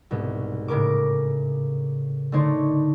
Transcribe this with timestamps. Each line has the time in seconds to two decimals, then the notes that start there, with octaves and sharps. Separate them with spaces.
0.11 C2 G#2 B2
0.68 A2 C#3 A#4 D6
2.32 D3 A3 D#4 C#5 C6 D6